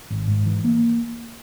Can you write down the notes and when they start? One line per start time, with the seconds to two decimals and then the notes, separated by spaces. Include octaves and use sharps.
0.10 G#1
0.28 G#2
0.46 E3
0.64 A#3